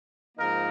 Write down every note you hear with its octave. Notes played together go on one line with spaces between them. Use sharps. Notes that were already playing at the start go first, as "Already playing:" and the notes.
G#2 F3 A#3 D#4 A#4